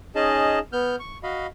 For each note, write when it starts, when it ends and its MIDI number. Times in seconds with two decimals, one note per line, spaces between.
0.15 0.59 61
0.15 0.59 63
0.15 0.59 68
0.15 0.59 75
0.15 0.59 81
0.73 0.96 59
0.73 0.96 89
0.73 0.96 91
1.00 1.18 85
1.23 1.47 66
1.23 1.47 75
1.23 1.47 77
1.23 1.47 83